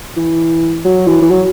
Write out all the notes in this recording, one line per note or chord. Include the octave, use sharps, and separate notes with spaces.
E3
F#3
E3
E3
F#3